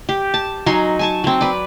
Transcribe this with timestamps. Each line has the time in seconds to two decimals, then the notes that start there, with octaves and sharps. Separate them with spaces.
0.09 G4
0.34 A5
0.66 F#3 D#4 G#5 C6
0.99 G#5 A5 C#6
1.24 F#3 C4
1.41 B4 D5